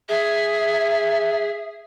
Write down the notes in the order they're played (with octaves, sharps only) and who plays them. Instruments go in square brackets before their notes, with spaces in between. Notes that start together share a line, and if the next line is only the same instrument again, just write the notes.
[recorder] G#4 [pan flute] E5